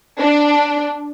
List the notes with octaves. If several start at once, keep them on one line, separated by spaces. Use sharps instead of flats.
D4